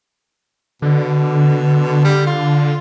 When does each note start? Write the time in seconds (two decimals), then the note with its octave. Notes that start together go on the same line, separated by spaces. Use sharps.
0.82 B2 D3
2.04 G3
2.27 F4